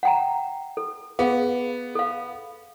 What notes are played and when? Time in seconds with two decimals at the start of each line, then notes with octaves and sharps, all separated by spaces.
0.03 F#5 G5 A#5
0.77 A4
1.19 B3 G#4 F5
1.95 A4 F5